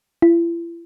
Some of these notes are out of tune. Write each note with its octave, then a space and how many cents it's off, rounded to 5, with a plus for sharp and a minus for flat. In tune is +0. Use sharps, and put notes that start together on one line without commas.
E4 +40